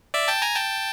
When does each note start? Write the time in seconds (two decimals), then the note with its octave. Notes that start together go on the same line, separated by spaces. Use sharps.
0.14 D5 E5
0.28 G5 A5
0.42 G#5 A#5
0.56 G5 A5